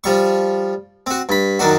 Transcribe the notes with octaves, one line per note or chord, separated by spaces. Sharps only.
F3 G3 C#6
C4 F#4
G2 B5
F#2 D#3 D4 F#4